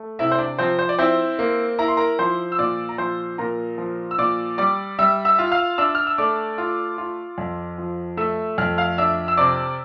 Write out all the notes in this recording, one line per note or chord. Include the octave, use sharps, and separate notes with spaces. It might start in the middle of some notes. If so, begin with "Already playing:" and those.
Already playing: A3
C3 E4 E5
C5
D4 D5
F3 C4 C5
C5
D5
C4 E4 C5
A#3
E4 A#5
C6
A#4 A#5
F3 C5 C6
E6
A#2 D5 D6
A#5
F3 C5 C6
A#2 A#4 A#5
F3
E6
A#2 D5 D6
G3 D5 D6
G3 E5 E6
E5 E6
F4
F5 F6
D4 E5 E6
F6
E6
A3 D5 D6
F4
F4
F2
F3
A3 E5 E6
F2 F6
F5 F6
D4 E5 E6
E6
C3 D5 D6